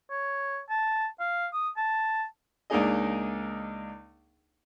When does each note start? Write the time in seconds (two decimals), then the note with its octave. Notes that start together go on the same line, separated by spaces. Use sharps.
0.11 C#5
0.70 A5
1.20 F5
1.53 D#6
1.77 A5
2.70 C#2 A#3 D4 D#4 G#4 D#5